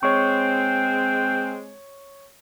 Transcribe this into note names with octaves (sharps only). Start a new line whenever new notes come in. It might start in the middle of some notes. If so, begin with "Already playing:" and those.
G#3 C4 C#5 G5 C#6